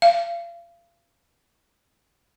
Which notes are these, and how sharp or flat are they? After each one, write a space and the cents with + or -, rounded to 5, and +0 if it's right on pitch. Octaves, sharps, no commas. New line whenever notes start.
F5 -35